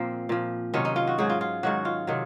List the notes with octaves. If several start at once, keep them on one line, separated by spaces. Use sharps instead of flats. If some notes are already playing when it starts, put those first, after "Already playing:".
Already playing: A#2 F3 A#3 C4
A#2 F3
C3 D#3 F#3 C#4
D#4
F4
F#4
G#2 F#3 G#4
F4
F4
G#2 D#3 F#3 F#4
F4
C3 D#3 F#3